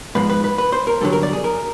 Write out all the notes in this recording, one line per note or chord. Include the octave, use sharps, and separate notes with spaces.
G#2 F3 G#3 B4
B4
B4
B4
C5
A#4
G2 D3 F#3 A4
A#4
D5
G#4
A#4